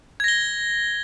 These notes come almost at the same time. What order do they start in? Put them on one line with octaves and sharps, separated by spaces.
G#6 A#6 G7